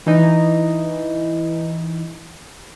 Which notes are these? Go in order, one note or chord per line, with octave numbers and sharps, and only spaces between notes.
E3 D#4